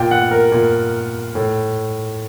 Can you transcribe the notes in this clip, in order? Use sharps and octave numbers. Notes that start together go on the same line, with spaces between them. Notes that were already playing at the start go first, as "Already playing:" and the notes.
Already playing: A#2 G5
F#5
A#4
A#2
A2